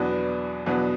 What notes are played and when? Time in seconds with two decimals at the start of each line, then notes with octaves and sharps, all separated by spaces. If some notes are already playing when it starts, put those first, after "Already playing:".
Already playing: E2 B2 F#3 B3 D4
0.66 E2 B2 F#3 B3 D4